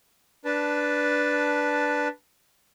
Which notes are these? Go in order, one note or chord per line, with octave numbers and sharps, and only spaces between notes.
D4 B4 A5